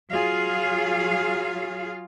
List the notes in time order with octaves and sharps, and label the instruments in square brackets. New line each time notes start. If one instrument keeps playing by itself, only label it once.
[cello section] F#3 F4 G#4 F5